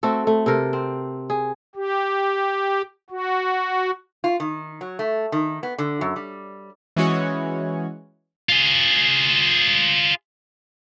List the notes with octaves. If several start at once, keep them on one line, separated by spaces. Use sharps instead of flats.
A3 C4 F#4 A4
A3
C3 A4 A#4
C4
G#4
G4
F#4
F4
D#3
F#3
A3
D#3
B3
D3
F#2
G3
E3 G#3 C#4 F#4 C#5
F4 G#4